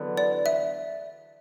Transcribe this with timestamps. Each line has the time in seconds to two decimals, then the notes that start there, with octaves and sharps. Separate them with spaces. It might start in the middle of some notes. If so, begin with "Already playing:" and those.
Already playing: E2 D3 F#3 B3 D4
0.17 D5
0.46 E5